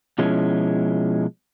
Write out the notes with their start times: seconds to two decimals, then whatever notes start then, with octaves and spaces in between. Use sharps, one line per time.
0.18 B2 F3 G#3 C#4 E4